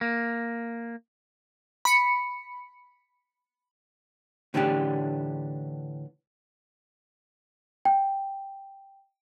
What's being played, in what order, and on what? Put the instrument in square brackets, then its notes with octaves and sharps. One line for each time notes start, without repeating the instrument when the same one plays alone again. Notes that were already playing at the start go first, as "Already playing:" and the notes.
[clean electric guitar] A#3
[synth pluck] B5 C#7
[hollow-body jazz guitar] A2 D3 E3 D4 G4
[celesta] G5